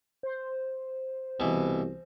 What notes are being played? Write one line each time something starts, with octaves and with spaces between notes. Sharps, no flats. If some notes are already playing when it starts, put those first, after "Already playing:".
C5
C2 B2 E3